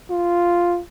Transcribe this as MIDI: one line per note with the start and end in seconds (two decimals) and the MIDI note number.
0.10 0.80 65